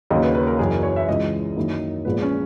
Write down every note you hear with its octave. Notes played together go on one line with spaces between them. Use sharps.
D#2 C#3 F#3 A#3 D#5
B4
B4
A#4
F#1 F#2 E3 G#4
A#4
C#5
E5
C#2 C#3 E3 G#3 D#5
F#2 D#3 A#3 E4
A#1 A#2 G#3 B3 B4
C#4